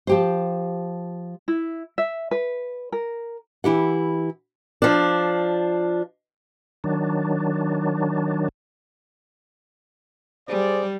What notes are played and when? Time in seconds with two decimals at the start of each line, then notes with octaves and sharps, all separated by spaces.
0.07 F3 G4 C5
1.48 E4
1.98 E5
2.31 B4
2.92 A#4
3.64 E3 E4 G4 F#5
4.82 F3 D4
6.84 D#3 F#3 D4
10.48 G3 G#4 C5 D5